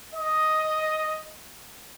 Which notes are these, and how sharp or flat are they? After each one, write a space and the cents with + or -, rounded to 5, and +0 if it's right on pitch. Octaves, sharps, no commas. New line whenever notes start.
D#5 +5